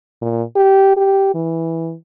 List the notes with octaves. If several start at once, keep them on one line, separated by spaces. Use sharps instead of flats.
A#2
G4
G4
E3